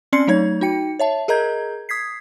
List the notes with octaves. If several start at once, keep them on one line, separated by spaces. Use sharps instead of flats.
C4 C#4 D5 C6 C7 C#7
F#3 A3 D#4 C#5 G#6
D#4 F#4 G5 C#7
C#5 E5 A5
G#4 A#4 D#5 A#5 G6 G#6
D#6 G#6 B6 C7